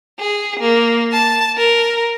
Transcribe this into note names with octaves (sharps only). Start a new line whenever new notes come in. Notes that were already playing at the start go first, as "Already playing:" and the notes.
G#4
A#3
A5
A#4